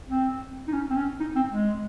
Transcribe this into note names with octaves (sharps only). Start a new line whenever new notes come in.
C4
D#4
C#4
C4
C#4
D#4
C4
G#3